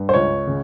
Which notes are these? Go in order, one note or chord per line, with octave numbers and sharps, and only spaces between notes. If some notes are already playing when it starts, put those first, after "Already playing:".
Already playing: G2
C5
C#2 C#5
C#3